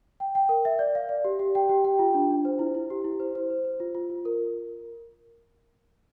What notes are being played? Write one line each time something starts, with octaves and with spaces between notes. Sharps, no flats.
G5
G5
A#4
E5
D5
F5
D5
G4
G4
G5
G4
G5
F4
D4
D4
C5
E4
E4
G4
E4
C5
C5
C5
C5
F4
F4
F4
A#4